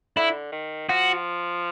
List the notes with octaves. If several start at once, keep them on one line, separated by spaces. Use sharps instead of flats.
D3 E4
D#3
F3 F#4